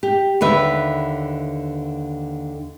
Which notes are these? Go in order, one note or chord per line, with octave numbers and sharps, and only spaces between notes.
G4
D#2 D3 B4 E5